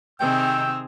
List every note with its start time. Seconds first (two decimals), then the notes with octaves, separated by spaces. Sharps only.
0.20 C3 D#3 C4 D#4 G#4 G5 E6